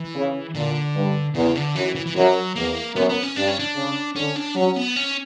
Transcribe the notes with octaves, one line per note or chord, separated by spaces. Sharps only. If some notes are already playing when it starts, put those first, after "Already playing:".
Already playing: E3
C#3
A#2 D3
G2
E2 C#3
D3
F#2 E3
E3
E3
F#2 F#3
E2 A#3
F#2 B3
B3
C#4
G2 D4
C#4
D4
C#3
D3 C#4
D4
F#3 C#4
B3
C#4